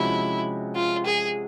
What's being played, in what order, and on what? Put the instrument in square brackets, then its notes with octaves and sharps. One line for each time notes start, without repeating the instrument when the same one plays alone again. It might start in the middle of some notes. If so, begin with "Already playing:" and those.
Already playing: [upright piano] C3 F3 G#3 C#4 F#4 [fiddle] E4
[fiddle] F4
G#4